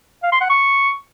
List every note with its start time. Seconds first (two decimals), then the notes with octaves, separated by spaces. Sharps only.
0.23 F5
0.32 C6
0.41 F#5
0.50 C#6